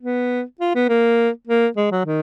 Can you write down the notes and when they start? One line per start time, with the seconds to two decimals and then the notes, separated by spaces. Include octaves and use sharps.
0.02 B3
0.60 F4
0.75 B3
0.89 A#3
1.47 A#3
1.76 G#3
1.91 F#3
2.05 D#3